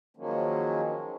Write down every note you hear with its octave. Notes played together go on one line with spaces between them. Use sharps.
D#3 F3 F#3 G#3 A#3 C#4